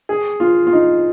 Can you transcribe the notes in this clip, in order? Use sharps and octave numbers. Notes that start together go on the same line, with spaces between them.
G#4
F4
F4
D#4